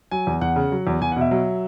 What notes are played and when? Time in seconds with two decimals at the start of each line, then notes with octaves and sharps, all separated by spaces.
0.11 F#3 G#5
0.27 E2
0.41 E2 F#5
0.56 C#3
0.72 F#3
0.87 E2
1.02 E2 G#5
1.12 F#5
1.16 B2 E5
1.31 F#3